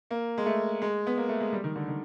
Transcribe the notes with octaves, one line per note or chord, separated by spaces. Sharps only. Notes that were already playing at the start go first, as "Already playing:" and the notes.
A#3
G#3
A3
G#3
B3
A#3
A3
G#3
G3
D#3
D3
D#3